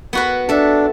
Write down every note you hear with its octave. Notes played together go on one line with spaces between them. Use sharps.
B3 F#4 B4
D4 A4 E5